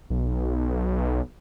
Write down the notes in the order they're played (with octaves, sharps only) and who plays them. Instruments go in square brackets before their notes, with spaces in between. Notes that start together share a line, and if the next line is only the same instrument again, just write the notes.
[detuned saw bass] B1